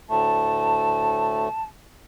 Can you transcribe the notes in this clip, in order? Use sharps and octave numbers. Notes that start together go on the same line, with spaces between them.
D2 A2 A3 A5